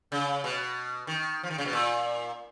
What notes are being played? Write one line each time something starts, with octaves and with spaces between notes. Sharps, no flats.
C#3
B2
D#3
F3
D#3
C#3
B2
A#2